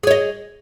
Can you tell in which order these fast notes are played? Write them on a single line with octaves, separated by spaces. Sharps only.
G#4 C#5 D#5